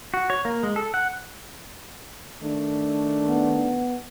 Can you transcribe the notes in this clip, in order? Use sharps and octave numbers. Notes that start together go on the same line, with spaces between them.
F#4
C#5
A#3
G#3
A4
F#5
D#3 A3 D4
B3